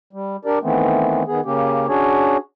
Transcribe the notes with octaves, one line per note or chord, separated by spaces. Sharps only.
G3
D4 G4 A#4 D5
D#3 E3 A3 B3 C4
D#3 B3 G#4
C#3 A#3 C#4 G4
C#4 D4 F#4 G#4 C#5